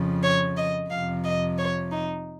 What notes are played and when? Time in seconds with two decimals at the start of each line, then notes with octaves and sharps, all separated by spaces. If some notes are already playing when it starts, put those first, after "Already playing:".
Already playing: F2 C#3 F3
0.23 C#5
0.57 D#5
0.90 F2 C3 F3 F5
1.24 D#5
1.58 C#5
1.91 D#4